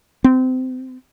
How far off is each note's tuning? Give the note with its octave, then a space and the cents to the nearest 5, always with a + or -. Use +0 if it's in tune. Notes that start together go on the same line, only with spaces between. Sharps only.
C4 -25